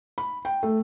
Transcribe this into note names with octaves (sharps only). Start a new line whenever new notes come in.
B5
G5
A3